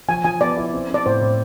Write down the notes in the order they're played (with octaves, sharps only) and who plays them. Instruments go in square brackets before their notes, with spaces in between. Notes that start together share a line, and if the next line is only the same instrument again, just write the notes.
[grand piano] F3 [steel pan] G#5
[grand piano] F3 [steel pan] G#5
[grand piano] B3 [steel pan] D5
[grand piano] E4
C4
C4
[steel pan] D5
[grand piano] A2 [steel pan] C5
[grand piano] A2